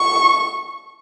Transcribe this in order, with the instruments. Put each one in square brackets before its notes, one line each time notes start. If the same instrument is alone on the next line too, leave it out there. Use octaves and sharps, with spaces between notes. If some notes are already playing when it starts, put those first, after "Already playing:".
Already playing: [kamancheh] C#6